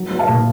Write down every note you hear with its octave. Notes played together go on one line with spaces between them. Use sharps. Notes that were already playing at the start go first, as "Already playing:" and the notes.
Already playing: F#3
F#3
F5 A5
A#2